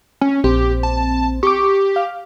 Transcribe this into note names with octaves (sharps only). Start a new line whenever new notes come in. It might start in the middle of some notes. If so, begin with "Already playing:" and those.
C#4
A#1 C4 G4
A5
G4 C#6 D6
F5